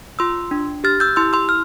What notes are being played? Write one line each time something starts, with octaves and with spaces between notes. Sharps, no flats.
F4 C6 E6
D4
G4 F6 A6
E6 G6
E4 C6 E6
C6 E6
F6